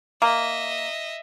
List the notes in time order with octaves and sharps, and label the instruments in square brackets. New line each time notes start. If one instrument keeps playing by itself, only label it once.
[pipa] A#3 [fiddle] D#5 E5